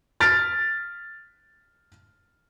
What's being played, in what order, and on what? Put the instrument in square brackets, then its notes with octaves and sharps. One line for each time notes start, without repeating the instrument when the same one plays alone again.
[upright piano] F6 A6 B6 D7